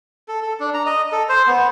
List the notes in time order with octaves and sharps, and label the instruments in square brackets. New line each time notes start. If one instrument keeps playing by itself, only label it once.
[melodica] A4
A4
D4
A#5
D#5
A4
C5
B3